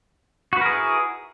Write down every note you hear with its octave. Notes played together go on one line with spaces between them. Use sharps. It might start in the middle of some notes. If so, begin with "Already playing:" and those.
E4 F#4 G#4 A#4 B4